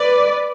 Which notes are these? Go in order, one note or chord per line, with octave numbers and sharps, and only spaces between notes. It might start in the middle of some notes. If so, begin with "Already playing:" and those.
Already playing: B4 D5